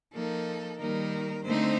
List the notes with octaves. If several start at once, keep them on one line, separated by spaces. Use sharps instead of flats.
F3 A#3 D#4 A4
D#3 G3 A#3 D#4 A#4
D3 A3 C4 D#4 C5